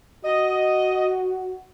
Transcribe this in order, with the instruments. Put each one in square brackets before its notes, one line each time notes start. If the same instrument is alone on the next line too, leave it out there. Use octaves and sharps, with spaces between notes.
[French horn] F#4 [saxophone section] D#5